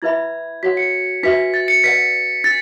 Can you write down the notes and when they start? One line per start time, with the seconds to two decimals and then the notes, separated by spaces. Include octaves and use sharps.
0.02 E4 B4 E5 B5 G#6
0.63 F#4 C#5 F#5 B6
0.77 C#7
1.23 D4 F#4 B4 E5 B6
1.54 A6
1.68 C#7
1.84 B4 D5 F#5 B6
2.44 D4 A6